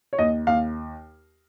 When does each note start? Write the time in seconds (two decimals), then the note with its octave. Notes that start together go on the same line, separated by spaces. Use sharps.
0.13 C#5
0.19 D#2 D#5
0.47 D#2 F5